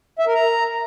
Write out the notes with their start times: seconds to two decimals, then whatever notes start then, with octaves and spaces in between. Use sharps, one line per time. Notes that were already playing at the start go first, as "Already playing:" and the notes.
0.19 E5
0.27 A#4
0.35 A#5